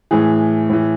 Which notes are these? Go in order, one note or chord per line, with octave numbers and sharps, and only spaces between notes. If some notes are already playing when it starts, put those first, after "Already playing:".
A2 E3 G#4
A2 E3